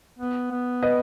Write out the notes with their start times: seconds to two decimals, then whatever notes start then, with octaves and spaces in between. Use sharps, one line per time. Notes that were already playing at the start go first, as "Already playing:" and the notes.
0.19 B3
0.51 B3
0.83 B4 D#5